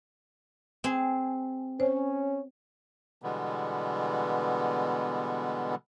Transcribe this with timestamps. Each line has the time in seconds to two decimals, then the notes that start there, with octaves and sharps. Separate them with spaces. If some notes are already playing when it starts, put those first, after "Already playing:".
0.84 C4 G#4
1.80 C#4 C5
3.22 B2 D3 E3 G3 G#3 B3